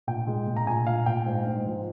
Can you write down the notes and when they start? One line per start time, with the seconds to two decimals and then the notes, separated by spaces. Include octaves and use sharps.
0.07 A#2 G5
0.27 G#3
0.47 A#2
0.56 A#5
0.67 A#2 G#5
0.87 A#2 F5
1.06 A#2 G5
1.26 G#2
1.47 G#2
1.66 F3